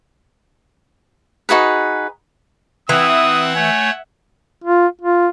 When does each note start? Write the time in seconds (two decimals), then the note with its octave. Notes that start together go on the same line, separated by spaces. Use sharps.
1.49 D#4 F#4 G#4 B4
2.89 E3 C4 E5 F#5 D#6
3.56 A3 C#5 G#5
4.64 F4
5.01 F4